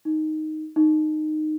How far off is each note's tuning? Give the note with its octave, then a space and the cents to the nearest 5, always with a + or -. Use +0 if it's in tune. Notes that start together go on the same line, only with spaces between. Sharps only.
D#4 +0
D#4 -15